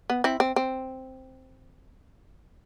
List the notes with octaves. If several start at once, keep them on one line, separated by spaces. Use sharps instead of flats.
B3
C4 E4
C4
C4